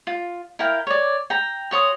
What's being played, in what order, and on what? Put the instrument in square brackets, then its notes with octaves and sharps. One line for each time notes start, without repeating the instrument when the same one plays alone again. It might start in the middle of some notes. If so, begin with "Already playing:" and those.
[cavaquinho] F4
E4 A#4 F5 G5
C#5 D5
G5 A#5
F#4 C#5 C6 D#6